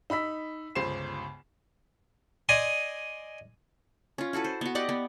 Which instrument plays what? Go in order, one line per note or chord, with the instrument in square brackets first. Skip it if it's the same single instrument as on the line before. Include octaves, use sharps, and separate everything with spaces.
[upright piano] D#4 B5 E6 B6
G1 C#2 C5 C7 E7
[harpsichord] D5 D#5 G#5 C6 D#6
[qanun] C#4 F4
E4 F#4 A4 B4
C5
B3 F#4
G4 D5 D#5 F#5
B3